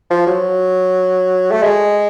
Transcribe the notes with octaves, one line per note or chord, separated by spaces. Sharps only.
F3
F#3
A3
G#3